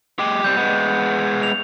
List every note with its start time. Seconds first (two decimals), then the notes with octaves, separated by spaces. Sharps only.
0.19 G#3 G4
0.44 C3 G3 G6
0.57 G#3 B3
1.43 F7